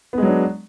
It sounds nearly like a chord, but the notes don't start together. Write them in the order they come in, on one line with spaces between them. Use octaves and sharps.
B3 G#3 F#3 D4